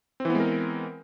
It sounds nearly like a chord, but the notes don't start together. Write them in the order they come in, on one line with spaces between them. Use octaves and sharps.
C4 E3 B3 G#3 A#4